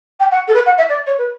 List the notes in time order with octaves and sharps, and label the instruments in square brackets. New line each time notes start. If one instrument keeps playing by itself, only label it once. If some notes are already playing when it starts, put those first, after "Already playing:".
[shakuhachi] G5
F#5
A4
B4
F#5
E5
D5
C#5
B4